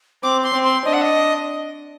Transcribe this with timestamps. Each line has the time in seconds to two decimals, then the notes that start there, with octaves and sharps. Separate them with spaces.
0.23 C4 D6
0.43 C6
0.53 C4
0.64 C6
0.85 D4 D#5
0.93 F#5
1.02 D#5